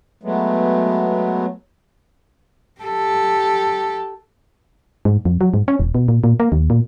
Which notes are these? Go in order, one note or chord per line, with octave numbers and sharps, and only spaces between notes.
F#3 G#3 A3 B3
G4 A4
G#2
F2
F#3
G#2
C#4
E1
B2
A#2
A#2
A#3
D#2
A#2